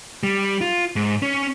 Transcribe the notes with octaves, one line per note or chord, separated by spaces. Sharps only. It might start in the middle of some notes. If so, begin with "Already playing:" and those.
G3
F4
G#2
C#4